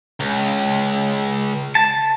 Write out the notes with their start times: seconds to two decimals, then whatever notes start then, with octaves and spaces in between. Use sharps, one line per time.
0.20 C#2
1.75 A5